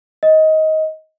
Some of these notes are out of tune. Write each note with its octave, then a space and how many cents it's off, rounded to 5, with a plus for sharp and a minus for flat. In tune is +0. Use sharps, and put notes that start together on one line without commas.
D#5 +15